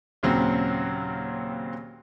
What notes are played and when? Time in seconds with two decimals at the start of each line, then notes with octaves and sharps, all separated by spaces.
0.23 D#2 A#2 C#3 F#3 C4